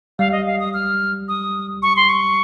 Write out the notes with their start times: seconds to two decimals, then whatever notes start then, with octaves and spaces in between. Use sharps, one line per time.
0.19 G3 F5
0.32 D#5
0.46 F5
0.60 D#6
0.74 F6
1.28 D#6
1.82 C#6
1.96 C6
2.09 C#6